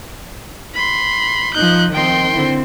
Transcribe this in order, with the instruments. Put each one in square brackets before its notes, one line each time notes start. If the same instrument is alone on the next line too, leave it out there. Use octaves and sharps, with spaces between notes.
[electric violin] B5 C6
[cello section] F3 D#4 [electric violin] F#6 G6
[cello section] D#3 F3 C4 [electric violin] G5 C6
[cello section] D3 C4 E4